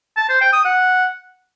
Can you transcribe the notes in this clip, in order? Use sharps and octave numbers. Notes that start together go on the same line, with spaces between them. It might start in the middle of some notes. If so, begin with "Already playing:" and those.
A5
C5
G5
D#6
F#5